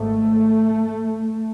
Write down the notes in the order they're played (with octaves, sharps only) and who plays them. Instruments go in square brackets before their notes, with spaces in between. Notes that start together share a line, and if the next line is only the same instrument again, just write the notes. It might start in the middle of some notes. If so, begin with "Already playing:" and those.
Already playing: [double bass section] G#1 G#2 A3